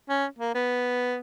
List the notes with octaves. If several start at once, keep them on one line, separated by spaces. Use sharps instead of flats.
C#4
A#3
B3